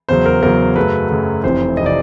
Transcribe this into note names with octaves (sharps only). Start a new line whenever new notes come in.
E2 C#3 F#3 C5
A#4
E2 C#3 F#3 A#4
F#2 C#3 F#3 A3 B4
F#2 C#3 F#3 A3
F1 F2 C3 E3 C5
C3 E3 D#5
D5